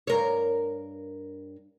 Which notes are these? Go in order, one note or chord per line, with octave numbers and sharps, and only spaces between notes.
G2 A#4 C#5